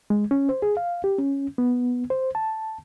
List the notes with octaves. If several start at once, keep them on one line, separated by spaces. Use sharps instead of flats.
G#3
C#4
C5
G#4
F5
G4
C#4
B3
C5
A5